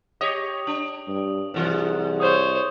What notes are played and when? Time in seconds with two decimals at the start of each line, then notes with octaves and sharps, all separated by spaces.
0.21 G4 C#5 D#5 D#6
0.67 D4 F#7
1.08 G2
1.54 C2 G#2 E3
2.20 C5 C#5 D#6 G6